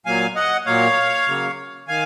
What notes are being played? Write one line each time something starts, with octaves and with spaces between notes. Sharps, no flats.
A#2 F#3 A#3 F5 G#5
D#5 F#5
A#2 F#3 A#3 C#5 F5
C#3 F#3 A#3
D#3 F5 G#5